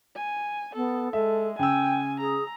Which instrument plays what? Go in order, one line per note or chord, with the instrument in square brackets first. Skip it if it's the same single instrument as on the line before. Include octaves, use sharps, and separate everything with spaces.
[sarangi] G#5
[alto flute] B3 [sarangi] A4
[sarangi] G#3 [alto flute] A4 [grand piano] E5
[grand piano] C#3 E6 [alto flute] G5 [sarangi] G#5
[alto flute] G#4 [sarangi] A#5